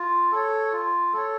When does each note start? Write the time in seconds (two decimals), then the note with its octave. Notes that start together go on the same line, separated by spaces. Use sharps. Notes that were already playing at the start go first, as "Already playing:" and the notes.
Already playing: F4
0.32 A4 C#5
0.72 F4
1.13 A4 C#5